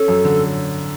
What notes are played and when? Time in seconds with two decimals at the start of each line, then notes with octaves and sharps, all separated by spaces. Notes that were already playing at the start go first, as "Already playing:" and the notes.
Already playing: C#4 A4
0.08 F#2
0.25 D3